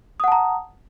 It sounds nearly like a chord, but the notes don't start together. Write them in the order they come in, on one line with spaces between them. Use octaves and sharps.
D#6 F#5 A5 A#5